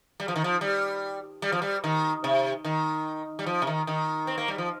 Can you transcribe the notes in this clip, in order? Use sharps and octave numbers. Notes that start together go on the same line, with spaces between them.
G3
F3
D#3
F3
G3
G3
F3
G3
D#3
C3
D#3
G3
F3
C3
D#3
D#3
C4
A#3
G3
F3